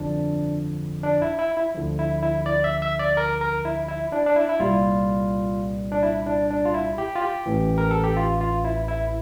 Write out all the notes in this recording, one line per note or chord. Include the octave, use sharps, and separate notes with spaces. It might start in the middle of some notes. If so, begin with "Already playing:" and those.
Already playing: G1 F2 D3 F3 D4
D4
E4
E4
E4
D2 D3 F3
E4
E4
D5
E5
E5
D5
A#4
A#4
E4
E4
D4
D4
E4
E4
C2 A#2 G3 F4
D4
E4
D4
D4
F4
E4
G4
F4
G4
A1 A2 E3
A#4
A4
G4
F4
F4
E4
E4